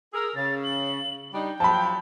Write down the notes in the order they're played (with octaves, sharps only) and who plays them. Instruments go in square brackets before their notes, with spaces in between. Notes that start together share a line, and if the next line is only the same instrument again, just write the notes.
[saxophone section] G#4 A#4 [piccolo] E6
[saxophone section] C#3 [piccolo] A6
[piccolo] F#7
[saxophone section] G3 D4 D#4 [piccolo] G5
[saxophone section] F3 F#3 [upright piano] A5 B5